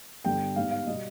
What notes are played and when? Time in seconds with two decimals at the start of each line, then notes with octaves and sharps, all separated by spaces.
0.25 G2 D3 G3 B3 G5
0.56 G#2 G3 B3 F5
0.71 F5
0.86 B2 G3 B3 D#5